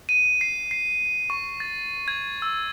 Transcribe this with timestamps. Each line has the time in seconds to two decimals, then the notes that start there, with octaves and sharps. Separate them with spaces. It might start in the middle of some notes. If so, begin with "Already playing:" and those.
0.09 D#7
0.41 C7
0.71 C7
1.30 C#6
1.60 A6
2.08 G#6
2.42 E6